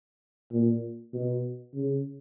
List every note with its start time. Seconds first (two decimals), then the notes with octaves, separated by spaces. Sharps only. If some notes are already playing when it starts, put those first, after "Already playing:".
0.52 A#2
1.14 B2
1.74 C#3